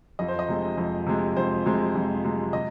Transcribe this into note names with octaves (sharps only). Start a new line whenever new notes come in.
F2 D#5
C5
D#5
C3 G#3
F2
C3 G#3
F2 C5
C3 G#3
F2
C3 G#3
C3 D#5